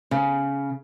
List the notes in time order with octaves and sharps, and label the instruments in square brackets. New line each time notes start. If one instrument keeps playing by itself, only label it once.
[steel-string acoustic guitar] C#3